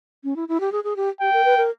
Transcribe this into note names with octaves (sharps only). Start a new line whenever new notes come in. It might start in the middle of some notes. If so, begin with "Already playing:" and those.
C#4
E4
E4
G4
G#4
G#4
G4
G4 G5
A#4
B4
A#4